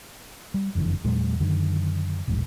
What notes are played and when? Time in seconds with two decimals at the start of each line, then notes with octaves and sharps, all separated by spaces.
0.54 G3
0.75 F#1 F2 D3 E3
1.04 E2 A#2 F#3 G#3
1.40 F#2 D3 D#3
2.27 E1 A#1 G#2